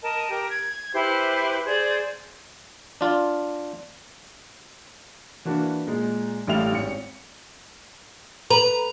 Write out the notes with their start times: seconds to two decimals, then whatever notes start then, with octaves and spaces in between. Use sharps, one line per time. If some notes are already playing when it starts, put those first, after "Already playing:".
0.03 A#4 D#5 A5
0.30 G4 A#4
0.50 G#6
0.94 E4 G4 B4 C5
1.65 G#4 C5 D5
3.01 D4 F4
5.45 E3 A#3 D4 F#4 B4
5.87 A#2 G#3
6.47 A1 A2 G3 A3 F5 F7
6.72 G#1 C#4 C#7
8.50 B4 A#5